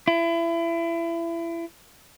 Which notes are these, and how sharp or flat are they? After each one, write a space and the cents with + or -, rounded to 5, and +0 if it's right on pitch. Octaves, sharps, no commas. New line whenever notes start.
E4 +30